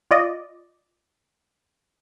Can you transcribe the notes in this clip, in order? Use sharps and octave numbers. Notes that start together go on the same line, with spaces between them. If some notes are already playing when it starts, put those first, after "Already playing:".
F4 D5 D#5